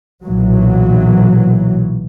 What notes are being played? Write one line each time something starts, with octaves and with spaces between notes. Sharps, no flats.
B1 A#2 E3 F#3